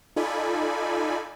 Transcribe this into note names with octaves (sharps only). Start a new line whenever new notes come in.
D#4 F4 A4 D5 G#5 B5